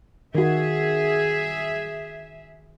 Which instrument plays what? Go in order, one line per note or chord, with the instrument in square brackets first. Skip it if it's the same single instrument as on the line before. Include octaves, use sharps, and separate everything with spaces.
[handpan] D#3 F#4 [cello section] G#4 E5